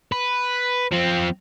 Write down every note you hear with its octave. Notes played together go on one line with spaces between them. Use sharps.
B4
F3 C4